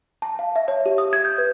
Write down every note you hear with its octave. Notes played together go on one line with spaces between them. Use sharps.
A5
F5
E5
C#5
G4
D#6
G#6
G6
B4